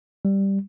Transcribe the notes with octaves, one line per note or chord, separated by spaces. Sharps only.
G3